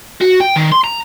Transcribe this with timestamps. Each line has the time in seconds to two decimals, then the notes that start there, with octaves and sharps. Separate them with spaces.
0.21 F#4
0.41 G5
0.56 D#3
0.72 C6
0.84 A#5